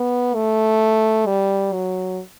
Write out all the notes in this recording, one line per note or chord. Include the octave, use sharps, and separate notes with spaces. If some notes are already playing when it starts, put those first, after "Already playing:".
Already playing: B3
A3
G3
F#3